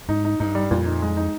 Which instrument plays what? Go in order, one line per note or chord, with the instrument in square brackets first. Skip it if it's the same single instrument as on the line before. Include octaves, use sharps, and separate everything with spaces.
[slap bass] G#2 [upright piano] D#4
[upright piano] D#4
[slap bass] G2 [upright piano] D#4
[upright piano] G3
[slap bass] F2 [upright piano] A#2
[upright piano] D#4
G#3
D#4